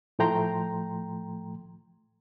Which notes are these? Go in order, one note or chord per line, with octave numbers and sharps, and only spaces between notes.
A2 F3 A3 G5 A#5 C6